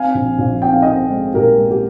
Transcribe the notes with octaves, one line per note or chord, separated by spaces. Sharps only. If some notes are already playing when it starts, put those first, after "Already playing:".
Already playing: C4 F5 G#5
A#1
A#1
C4 G5
F5
C4 D#5 G5
G#3
A#2 G4 A#4
G#3
G4